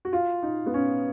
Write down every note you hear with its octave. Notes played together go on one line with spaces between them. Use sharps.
F#4
F4
D#4
B3
C#4